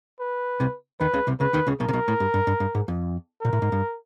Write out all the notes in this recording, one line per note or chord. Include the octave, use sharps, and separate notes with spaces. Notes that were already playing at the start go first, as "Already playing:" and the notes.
B4
C2 C3
D#2 D#3 B4
C#2 C#3
C2 C3
C#2 C#3 B4
D#2 D#3
C#2 C#3
B1 B2 A#4
C3
B1 B2
A2
G2
G2
G2
G2
G#2
F2
A#2 A#4
A2
G#2
G2